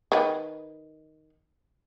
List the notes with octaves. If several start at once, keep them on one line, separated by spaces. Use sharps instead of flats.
D#3 B4